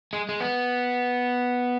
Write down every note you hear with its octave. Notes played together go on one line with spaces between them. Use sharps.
G#3
G#3
B3